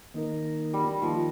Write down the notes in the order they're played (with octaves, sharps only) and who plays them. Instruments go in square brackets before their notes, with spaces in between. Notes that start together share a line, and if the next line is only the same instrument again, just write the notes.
[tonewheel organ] D#3 A#3 D#4 A#4
[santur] G3
[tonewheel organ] D#3 A#3 D#4 A#4 [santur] F3